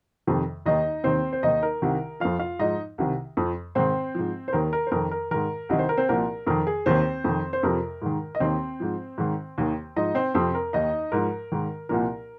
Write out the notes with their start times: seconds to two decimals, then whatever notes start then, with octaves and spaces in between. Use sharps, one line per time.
0.27 F2 C3 D#3
0.66 D#2 D#3 D#4 D#5
1.04 D#2 D#3 C4 C5
1.33 C5
1.43 D#2 D#3 D#4 D#5
1.63 A#4
1.82 C2 C3 D#3
2.20 F2 F3 F4 F5
2.39 F4 F5
2.59 G#2 F3 D#4 D#5
2.98 C2 C3 D#3
3.37 F2 F3
3.75 G#2 D#3 C4 C5
4.15 G#2 F3
4.48 C5
4.53 D#2 D#3 A#4
4.73 A#4
4.87 C5
4.91 F2 D#3 A#4
5.11 A#4
5.31 G#2 D#3 A#4
5.69 C2 C3 D#3 D#5
5.79 C5
5.89 A#4
5.97 C4 C5
6.09 C2 A#2 F3 A#4
6.47 F2 D#3 A#4
6.67 G#4
6.86 D#2 D#3 C4 C5
7.24 F2 D#3
7.53 C5
7.63 F2 C3 F3 A#4
8.02 G#2 D#3
8.35 D#5
8.40 D#2 D#3 C4 C5
8.80 G#2 F3
9.18 G#2 D#3
9.58 D#2 D#3
9.96 G#2 F3 D#4 D#5
10.15 C4 C5
10.34 F2 C3 F3 C4 C5
10.55 A#4
10.73 D#2 D#3 D#4 D#5
11.12 G#2 F3 A#4
11.52 G#2 D#3
11.89 C2 A#2 F3 A#4